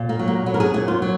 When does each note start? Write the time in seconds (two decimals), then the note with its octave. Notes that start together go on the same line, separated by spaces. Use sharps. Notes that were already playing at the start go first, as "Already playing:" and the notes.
Already playing: A#2
0.09 A#3
0.19 F#3
0.28 A#3
0.46 F#3 B3
0.54 A#4
0.60 G#4
0.74 A#2 G#4
0.88 F4
1.02 F#3